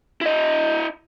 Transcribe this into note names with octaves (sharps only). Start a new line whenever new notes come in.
E4 D#5